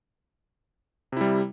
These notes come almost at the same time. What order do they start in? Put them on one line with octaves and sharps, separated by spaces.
C3 E4 G3